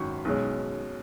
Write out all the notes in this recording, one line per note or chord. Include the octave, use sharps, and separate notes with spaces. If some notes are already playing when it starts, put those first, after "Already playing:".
Already playing: G#1 F#2 D#3 F#3 C#6
B1 B2 G#3 C#4